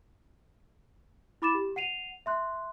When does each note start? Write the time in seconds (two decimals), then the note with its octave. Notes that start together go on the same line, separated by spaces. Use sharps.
1.42 E4 B5 D6 A6 E7
1.54 G4
1.76 F#5 C7 D#7 F7
2.26 E5 C6 F#6